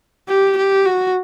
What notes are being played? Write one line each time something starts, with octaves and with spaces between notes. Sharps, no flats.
G4
G4
F#4